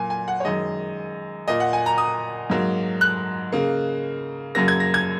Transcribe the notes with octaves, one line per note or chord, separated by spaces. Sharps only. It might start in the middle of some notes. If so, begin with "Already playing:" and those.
Already playing: A#2 F#3 A#3 G#5
G#5
F#5
C#5
F#2 D#3 G#3 D#5
A#2 A#3 D#5
F#5
G#5
A#5
D#6
G#2 F#3 A#3
F#6
C#3 A#3
F#2 C#3 F#3 A#3 A#6
G#6
A#6
G#6